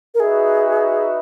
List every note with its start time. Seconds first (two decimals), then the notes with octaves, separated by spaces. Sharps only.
0.14 A#4
0.19 D#4 F#4 G#4 B4 E5